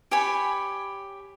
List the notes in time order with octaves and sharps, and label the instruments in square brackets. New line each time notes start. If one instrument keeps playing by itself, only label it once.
[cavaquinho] G4 C#5 G#5 B5